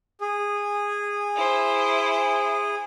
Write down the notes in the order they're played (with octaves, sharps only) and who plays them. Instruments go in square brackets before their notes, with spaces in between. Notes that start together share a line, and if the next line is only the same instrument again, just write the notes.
[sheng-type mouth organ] G#4
[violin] E4 C5